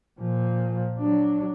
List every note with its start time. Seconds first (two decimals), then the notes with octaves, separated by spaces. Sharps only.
0.20 A#2 F3
0.99 F#3 D4